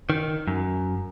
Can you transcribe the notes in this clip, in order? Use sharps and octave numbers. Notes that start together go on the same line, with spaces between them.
D#3
F#2